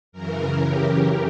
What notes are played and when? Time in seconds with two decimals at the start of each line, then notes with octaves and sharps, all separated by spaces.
0.12 F#2 C#3 E3 A#4
0.61 G4